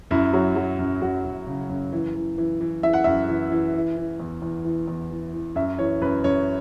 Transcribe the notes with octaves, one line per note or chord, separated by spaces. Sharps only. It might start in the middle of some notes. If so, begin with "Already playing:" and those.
F#2 E4
F#3
F#3
F#2
F#2 F#4
F#2
C#3
F#2
E3
E3
E3
E3
E3 E5
F#5
F#2 E5
E3
E3
E3
E3
E2
E2
E3
E2
E3
E3
F#2 E5
E3 C#5
F#2 B4
F#2 C#5